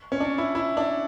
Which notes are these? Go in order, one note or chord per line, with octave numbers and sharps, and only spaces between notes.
C#4
D4
E4
E4
D4